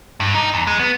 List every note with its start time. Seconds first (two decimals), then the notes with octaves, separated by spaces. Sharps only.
0.20 G2
0.35 D#4
0.54 E2
0.67 G#3
0.79 B3